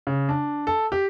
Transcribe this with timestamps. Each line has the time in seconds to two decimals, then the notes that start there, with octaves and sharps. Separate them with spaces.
0.07 C#3
0.29 D4
0.67 A4
0.92 G4